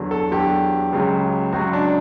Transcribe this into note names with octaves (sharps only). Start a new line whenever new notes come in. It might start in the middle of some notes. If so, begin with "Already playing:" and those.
Already playing: E2 D3 F#3
A4
E2 D3 F#3 G4
C#2 C#3 F#3
C#2 C#3 F#3 F#4
D4